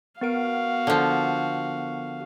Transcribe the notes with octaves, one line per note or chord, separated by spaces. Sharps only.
B3 F#4 A#4 F5 D7
D3 F3